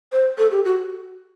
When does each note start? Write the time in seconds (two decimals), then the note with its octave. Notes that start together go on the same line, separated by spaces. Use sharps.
0.12 C5
0.38 A4
0.51 G4
0.65 F#4